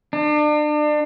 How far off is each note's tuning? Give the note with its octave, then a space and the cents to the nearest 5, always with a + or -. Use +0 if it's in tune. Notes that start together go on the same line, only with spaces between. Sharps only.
D4 +35